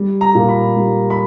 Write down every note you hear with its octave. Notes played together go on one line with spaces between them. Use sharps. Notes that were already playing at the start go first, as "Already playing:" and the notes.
Already playing: G3
A#5
A#2
B5
G3
B5